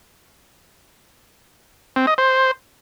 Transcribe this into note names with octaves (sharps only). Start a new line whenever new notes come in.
C4
D#5
C5